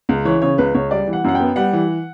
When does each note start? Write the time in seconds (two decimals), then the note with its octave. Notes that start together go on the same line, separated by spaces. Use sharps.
0.09 C#2
0.25 E3 C#5
0.42 C#3 C#5
0.58 C#2 B4
0.74 C#2 C#5
0.91 G3 D5
1.07 E3
1.13 F#5
1.24 F#2 F#5
1.35 B3 G5
1.56 G3 F#5
1.73 E3